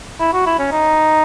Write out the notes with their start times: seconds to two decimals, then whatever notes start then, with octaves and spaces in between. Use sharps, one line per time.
0.20 E4
0.33 F#4
0.46 E4
0.59 C#4
0.72 D#4